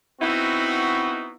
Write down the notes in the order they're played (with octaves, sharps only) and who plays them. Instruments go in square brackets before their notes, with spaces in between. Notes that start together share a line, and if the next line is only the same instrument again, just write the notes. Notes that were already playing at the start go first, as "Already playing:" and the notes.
[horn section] B3 C4 D#4 E4 F#4